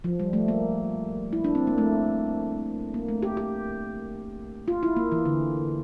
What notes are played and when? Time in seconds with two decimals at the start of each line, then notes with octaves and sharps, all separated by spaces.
0.04 F3
0.20 G3
0.33 A3
0.48 A#3
1.33 E4
1.44 D4
1.55 C4
1.67 A#3
1.78 A3
2.94 A#3
3.09 A3
3.23 G4
3.37 G4
4.68 F4
4.83 E4
4.96 A#3
5.12 E3
5.25 D3